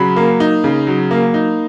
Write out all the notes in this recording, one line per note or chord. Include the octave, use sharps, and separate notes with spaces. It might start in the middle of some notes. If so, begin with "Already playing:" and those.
Already playing: C#3 F#3 B5
A#3
D#4
C#3
F#3
A#3
D#4